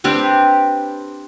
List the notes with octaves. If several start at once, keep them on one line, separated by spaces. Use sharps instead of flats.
C4 D4 G4 B4